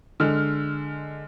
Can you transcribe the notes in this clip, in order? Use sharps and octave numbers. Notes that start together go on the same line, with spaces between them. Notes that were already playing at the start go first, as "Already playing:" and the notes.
D3 G#3 F6